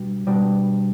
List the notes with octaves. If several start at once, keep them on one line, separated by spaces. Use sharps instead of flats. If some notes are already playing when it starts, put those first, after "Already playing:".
Already playing: B2 G3 D4
B2 G3 D4